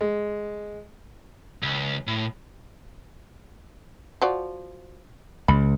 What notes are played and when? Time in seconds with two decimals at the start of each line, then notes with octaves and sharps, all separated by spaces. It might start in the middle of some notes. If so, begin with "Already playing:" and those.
0.01 G#3
1.63 C#2
2.07 A2
4.22 F3 F#4 D5
5.48 C#2 B5